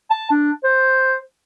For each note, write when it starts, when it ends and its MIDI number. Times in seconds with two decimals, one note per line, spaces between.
0.10 0.28 81
0.31 0.52 62
0.64 1.17 72